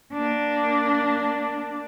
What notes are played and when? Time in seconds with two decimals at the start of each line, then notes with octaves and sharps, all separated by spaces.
0.13 A#3 D4